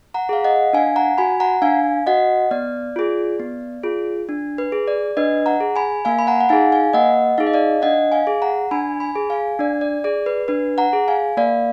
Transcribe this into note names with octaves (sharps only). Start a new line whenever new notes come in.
F#5 A#5
G#4 F5
D#5 F#5
D4 F5 G#5
F#5 A#5
F#4 G#5 B5
F#5 A#5
D4 F5 G#5
F#4 D#5 F#5
B3 D5
F4 G#4
B3
F4 G#4
D4
B4
G#4
D5
D4 B4 D#5
F#5 A#5
G#4
G#5 B5
A#3 F5 G#5
B5
F#5 A#5
F#5
D#4 G#4 F5 G#5
F5 G#5
A#3 D#5 F#5
D#4 G#4 F5
D#5
D5 F5
D4 D#5 F#5
F5 G#5
G#4
F#5 A#5
D4 G#5 B5
G#5 B5
G#4
F5 G#5
D4 D5
D5
G#4 D5
B4
D4 B4
F#5 A#5
G#4
F5 G#5
A#3 D5 F5